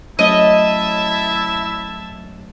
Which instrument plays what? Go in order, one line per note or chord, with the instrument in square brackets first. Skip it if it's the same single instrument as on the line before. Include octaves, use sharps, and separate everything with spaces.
[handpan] F#3 A3 C#4 [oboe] E4 [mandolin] D#5 [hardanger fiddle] E5 A5